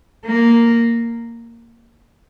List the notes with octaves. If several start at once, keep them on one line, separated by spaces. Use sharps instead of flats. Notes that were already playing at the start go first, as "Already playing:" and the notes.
A#3